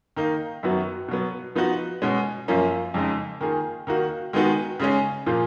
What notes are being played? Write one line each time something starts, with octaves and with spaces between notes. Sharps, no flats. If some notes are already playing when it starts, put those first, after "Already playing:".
D#3 A#3 D#4
F#2 D#3 F#3 B3 F#4
B2 F#3 B3
F3 B3 D#4 F#4
B2 G#3 C#4
F#2 F3 A#3 C#4
F2 C#3 G#3 D#4
D#3 A#3 F4 G#4
D#3 A#3 D#4 F#4
D#3 G#3 B3 D#4 F#4
C#3 G#3 C#4
A#2 F3 A#3 F4 G#4